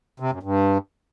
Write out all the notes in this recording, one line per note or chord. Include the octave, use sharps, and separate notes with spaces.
C3
F#2
G2